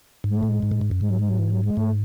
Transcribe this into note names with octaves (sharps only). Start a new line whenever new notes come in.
G#2
G#3
A3
A2
G#3
G#2
A2
G#2
F#2
G#2 G#3
F#3
G#3
F#3
E3
F#3
G#3
G#2 A3